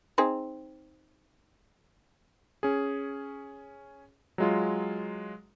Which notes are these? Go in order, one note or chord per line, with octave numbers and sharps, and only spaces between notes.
C4 D#4 G#4
C#4 G#4
F#3 G#3 F4